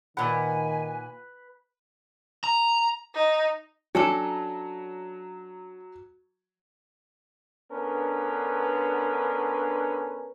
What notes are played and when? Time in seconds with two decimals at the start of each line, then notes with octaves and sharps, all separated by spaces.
0.17 A#2 D#3 B4 F#5 G#5
2.44 A#5
3.15 D#4
3.95 F#3 C#4 D4 A4
7.71 D3 B3 C#4 D4 A#4 B4